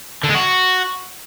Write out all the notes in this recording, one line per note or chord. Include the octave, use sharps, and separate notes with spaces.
D3
G#3
F#4